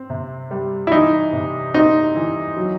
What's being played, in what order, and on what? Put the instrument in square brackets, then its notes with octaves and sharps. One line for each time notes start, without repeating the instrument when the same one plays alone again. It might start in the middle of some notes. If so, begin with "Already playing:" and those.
Already playing: [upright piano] C4
C3
G3
[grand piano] E4
[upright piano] E3 [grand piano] D#4
[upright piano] C3
[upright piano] C4 [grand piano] D#4
[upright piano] E3
F#3